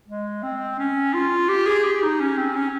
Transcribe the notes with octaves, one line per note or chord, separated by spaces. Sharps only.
G#3
C4
C#4
F4
G4
G#4
G4
D#4
C#4
C4
C#4